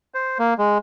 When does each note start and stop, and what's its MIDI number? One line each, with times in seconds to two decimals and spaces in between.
0.14 0.38 72
0.39 0.54 58
0.58 0.78 56